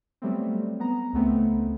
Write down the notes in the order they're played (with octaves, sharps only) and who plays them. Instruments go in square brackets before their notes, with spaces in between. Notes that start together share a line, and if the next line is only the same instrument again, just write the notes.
[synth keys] F#3 G3 A3 B3 C4
B3 A#5
C#2 A3 B3 C4